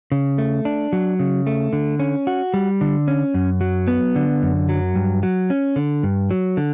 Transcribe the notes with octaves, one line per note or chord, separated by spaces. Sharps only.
C#3
A3
D4
F#3
C#3
A3
D3
C#4
F#4
G3
D3
C#4
F#2
F#3
B3
D3
F#2
F#3
G2
F#3
C#4
D3
G2
F#3
D3